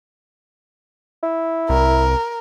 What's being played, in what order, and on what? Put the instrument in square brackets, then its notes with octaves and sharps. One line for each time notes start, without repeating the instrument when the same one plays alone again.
[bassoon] E4
[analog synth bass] C2 [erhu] A#4